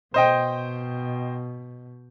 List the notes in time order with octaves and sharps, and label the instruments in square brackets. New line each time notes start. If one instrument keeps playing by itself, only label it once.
[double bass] B2 [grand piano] C5 D#5 G5